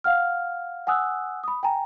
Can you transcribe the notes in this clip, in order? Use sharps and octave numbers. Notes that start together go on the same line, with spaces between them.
F5 F#5 F6
F#5 G#5 D#6 E6 F#6
B5 D#6
G5 G#5 A#5